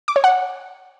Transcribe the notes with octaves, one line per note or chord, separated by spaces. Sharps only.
D6
C#5
F#5